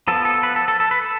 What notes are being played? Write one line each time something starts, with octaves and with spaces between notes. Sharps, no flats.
F3 B3 A4
A4
B4
A4
A4
A4
B4
A4